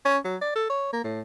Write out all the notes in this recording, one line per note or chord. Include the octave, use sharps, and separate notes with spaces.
C#4
F#3
D5
A4
C#5
A#3
A2